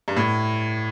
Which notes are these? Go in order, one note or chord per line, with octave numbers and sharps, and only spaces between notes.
G2
A2